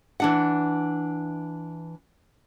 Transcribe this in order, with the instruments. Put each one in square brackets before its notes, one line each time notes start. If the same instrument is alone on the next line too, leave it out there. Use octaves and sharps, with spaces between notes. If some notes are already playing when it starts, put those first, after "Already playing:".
[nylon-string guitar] E3 D4 F#5